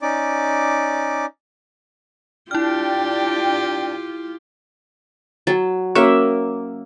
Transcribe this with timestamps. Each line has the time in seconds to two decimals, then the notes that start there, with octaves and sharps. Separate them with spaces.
0.02 C#4 D#4 D5 D6
2.51 D4 E4 F4 G4 D5 G5 F6
5.47 F#3 A6
5.95 A#3 C#4 F#4 A#4 C#5 E5